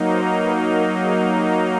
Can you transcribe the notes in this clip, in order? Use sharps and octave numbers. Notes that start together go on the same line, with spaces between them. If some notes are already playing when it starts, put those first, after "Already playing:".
Already playing: F#3 A#3 D#4
C5
B4
A#4
G#4
G4